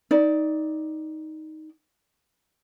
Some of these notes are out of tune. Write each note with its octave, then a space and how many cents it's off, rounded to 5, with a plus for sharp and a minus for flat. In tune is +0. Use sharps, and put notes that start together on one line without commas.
D#4 +10 D5 +0